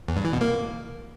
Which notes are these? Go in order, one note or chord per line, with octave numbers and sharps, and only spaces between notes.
E2
G2
E3
B2
A#3